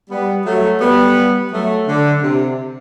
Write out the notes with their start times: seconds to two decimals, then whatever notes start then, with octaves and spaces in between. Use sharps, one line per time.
0.10 G3 B3
0.45 F#3 A3
0.80 G3 B3
1.51 F#3 A3
1.87 D3
2.23 C3